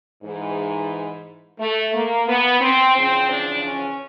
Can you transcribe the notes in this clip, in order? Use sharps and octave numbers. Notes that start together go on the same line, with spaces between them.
G#2 E3
A3
A#3
B3
C4
E2 C#3 F3 C4
D4
C#4